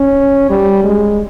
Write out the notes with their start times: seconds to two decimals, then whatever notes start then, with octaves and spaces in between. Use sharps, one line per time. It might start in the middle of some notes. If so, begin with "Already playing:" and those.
Already playing: C#4
0.50 G3
0.84 G#3